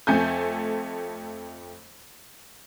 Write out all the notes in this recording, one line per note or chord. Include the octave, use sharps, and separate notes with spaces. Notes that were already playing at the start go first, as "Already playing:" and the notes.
F2 A3 A4 G#5 G6